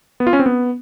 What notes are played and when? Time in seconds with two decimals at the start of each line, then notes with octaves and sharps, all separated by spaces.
0.20 B3
0.27 F4
0.33 C#4
0.39 C4
0.46 B3